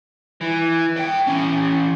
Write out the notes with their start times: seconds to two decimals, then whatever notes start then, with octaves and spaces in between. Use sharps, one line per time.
0.41 E3
0.97 A4 G5
1.27 E3 C#4